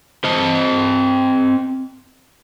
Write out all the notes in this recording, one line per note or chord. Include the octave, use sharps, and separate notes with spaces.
C4 D#5